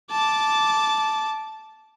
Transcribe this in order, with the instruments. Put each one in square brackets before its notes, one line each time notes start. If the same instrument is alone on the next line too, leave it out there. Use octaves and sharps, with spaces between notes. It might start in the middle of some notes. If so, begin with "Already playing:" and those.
[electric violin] A5 D6